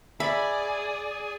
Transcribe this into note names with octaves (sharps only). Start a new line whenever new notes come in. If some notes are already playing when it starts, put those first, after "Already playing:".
G#4 D5 E5 B5